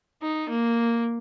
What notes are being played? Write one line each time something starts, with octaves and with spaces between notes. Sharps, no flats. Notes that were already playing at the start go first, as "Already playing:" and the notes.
D#4
A#3